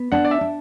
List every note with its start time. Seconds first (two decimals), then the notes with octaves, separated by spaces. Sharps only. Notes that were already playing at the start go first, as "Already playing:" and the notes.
Already playing: B3
0.12 D4 F#5
0.25 D5
0.31 E5
0.41 D4